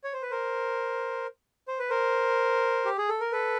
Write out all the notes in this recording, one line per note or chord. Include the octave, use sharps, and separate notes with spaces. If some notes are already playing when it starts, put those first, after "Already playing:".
C#5
C5
B4
A#4 C5
C5
B4
A#4 C5
G4
G#4
A4
A#4
A4 B4